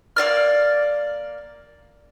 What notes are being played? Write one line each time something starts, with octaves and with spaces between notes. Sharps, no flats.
A#3 F4 D5 F6